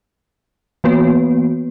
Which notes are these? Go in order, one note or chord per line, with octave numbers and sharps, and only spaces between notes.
E3 A#3 B3 F#4 B4 C#5